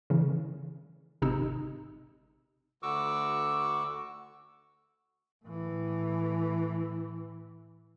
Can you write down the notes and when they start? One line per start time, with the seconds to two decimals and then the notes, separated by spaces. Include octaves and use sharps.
0.10 C#3 E3
1.22 G#1 C3 D#4 E6
2.83 D2 D3 F#4 C#6 D6 E6
5.45 A2 E3